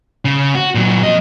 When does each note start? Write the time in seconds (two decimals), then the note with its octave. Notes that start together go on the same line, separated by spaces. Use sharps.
0.25 C#3
0.55 F#4
0.75 A#2 F#3
1.03 F2 D#5